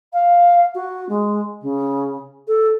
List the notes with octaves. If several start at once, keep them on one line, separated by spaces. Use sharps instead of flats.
F5
F#4
G#3
C#3
A4